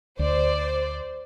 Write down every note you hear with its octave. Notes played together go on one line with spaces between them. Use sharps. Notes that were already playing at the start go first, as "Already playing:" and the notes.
D2 C5 D5